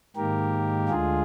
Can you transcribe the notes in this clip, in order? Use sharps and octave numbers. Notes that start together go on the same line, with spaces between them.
G#2 D#3 A#3 G4 A#4
D2 D3 G#3 F4 G#4